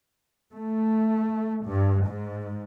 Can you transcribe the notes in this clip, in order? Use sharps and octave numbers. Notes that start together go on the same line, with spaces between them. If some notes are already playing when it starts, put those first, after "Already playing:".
A3
G2
G#2